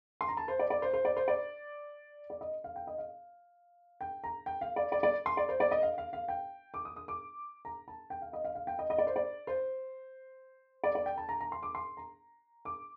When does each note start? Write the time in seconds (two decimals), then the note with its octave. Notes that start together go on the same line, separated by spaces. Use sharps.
0.21 C6
0.28 A#5
0.37 A5
0.48 C5
0.59 D5
0.70 D5
0.82 C5
0.94 C5
1.05 D5
1.17 C5
1.28 D5
2.30 D5
2.41 D#5
2.64 F5
2.76 G5
2.87 D#5
2.98 F5
4.01 G5
4.24 A#5
4.46 G5
4.61 F5
4.76 D5
4.92 D5
5.03 D5
5.26 C6
5.37 D5
5.49 C5
5.60 D5
5.71 D#5
5.83 F5
5.98 F5
6.13 F5
6.28 G5
6.74 D6
6.85 D#6
6.96 D#6
7.08 D6
7.65 A#5
7.88 A5
8.10 G5
8.22 F5
8.33 D#5
8.45 F5
8.56 F5
8.67 G5
8.79 D#5
8.90 D#5
8.98 D5
9.07 C5
9.16 D5
9.47 C5
10.84 D5
10.95 D5
11.06 G5
11.17 A5
11.29 A#5
11.41 A#5
11.52 C6
11.63 D6
11.75 C6
11.97 A#5
12.65 D6